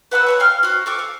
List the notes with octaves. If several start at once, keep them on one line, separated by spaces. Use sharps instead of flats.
B4 F#5 B5 E6
C#5 A5 B5
F5 G5 F6
F#4 C5
A4 C#6 D6
F5